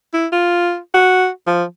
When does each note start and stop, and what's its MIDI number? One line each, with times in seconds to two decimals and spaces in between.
0.14 0.27 64
0.33 0.78 65
0.94 1.29 66
1.47 1.64 53